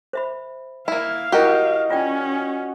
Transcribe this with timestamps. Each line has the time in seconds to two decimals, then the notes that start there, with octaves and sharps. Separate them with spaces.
0.13 C5 E5 B5
0.88 A#3 E4 F5
1.32 D#4 E4 F#4 G4 A#4 D#5 D#6
1.90 C#4 F4 D5 G5